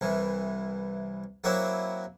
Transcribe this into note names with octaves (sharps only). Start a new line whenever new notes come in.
C2 E3
F#3 A#3 C4 E4 F#4